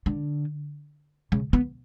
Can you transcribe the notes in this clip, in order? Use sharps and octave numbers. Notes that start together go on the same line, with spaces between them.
D3
C#3
B3